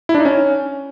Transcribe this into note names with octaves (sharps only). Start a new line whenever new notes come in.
E4
D4
D#4
C#4